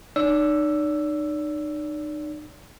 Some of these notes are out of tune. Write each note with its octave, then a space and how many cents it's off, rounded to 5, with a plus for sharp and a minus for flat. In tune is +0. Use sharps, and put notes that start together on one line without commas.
D#4 -40 D5 -40 E6 +10